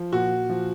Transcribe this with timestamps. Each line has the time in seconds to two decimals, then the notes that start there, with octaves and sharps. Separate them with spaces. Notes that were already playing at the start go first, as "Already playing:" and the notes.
Already playing: F3
0.12 A#2 F#4
0.49 F3